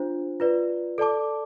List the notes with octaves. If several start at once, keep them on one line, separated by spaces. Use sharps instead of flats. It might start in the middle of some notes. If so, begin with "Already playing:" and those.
Already playing: D4 F4 C5
F4 B4 D5
A4 D5 A5 D6